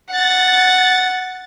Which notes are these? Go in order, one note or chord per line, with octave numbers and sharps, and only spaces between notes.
F#5 A6